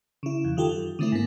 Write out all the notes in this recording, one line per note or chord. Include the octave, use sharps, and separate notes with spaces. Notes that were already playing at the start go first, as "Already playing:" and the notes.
C#3 E4
F2
D#3 F4 G4 A4
F#2
D3 D#3 A3 C4 E4
G#2 A#3